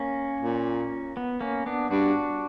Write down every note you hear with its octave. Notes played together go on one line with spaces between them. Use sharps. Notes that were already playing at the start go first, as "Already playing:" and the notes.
Already playing: A#3 C#4
A#2
B3
A#3 C#4
B3 D4
G2 D4 F#4